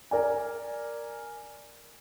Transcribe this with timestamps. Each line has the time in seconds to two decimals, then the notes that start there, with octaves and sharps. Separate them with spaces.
0.11 A#4 D5 G#5